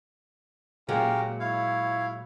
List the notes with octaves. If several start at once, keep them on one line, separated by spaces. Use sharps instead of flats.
A#2 F#3 G#3 C#4 G4 A#4 F5
E4 C#5 F5